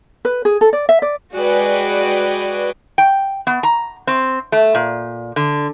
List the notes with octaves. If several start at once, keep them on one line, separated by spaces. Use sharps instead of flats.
B4
G#4
A4
D5
E5
D5
G#3 F#4 G#4 B4 D5 G5
G5
B3
A#5
C4
A3
A#2
D3